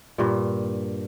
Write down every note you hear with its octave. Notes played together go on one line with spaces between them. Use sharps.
G2 A#2